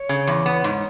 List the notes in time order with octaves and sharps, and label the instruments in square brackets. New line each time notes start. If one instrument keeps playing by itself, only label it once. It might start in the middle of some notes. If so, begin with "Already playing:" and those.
Already playing: [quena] C#5
[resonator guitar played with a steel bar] C#3
E2
B3
G#2